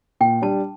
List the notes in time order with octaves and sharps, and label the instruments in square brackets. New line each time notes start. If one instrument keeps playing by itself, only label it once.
[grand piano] A#2 [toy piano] G5
[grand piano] G3 D4 [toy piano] A5